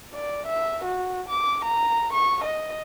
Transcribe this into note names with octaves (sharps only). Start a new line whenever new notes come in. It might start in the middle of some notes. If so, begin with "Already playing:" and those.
D5
E5
F#4
D6
A#5
C#6
D#5